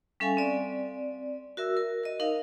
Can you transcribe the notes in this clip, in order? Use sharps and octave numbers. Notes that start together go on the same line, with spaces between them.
G3 C#4 A4 E5 F5 G#5
C4 D5
F#4 A#4 E5 E6
A#4
A#4 D#5
D#4 A#4 D#5 F5